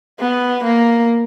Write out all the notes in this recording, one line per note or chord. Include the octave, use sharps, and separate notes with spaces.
B3
A#3